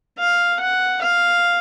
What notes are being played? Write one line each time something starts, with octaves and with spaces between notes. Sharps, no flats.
F5
F#5
F5